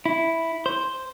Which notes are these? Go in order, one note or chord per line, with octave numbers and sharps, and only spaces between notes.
E4
C5